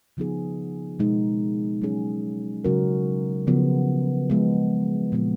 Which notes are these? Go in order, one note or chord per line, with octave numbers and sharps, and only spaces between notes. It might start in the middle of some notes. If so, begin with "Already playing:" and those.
C#3 F3 B3 D#4 G#4
B2 G#3 D#4 G#4
F#3 C#4 G#4
C#3 F#3 C#4 F#4 A#4
C#3 F3 B3
C#3 F3 G#3 B3
A#2 F3 G#3 B3